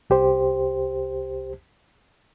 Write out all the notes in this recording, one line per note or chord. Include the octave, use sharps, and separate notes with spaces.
C2 G4 C5